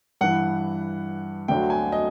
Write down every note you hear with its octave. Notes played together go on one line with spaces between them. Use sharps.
G2 E3 F#5
D2 D3 F#3 G5
G#5
D#5